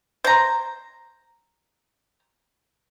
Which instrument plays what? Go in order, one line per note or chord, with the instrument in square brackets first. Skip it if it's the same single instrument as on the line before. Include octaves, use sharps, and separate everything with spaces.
[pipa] C5 A#5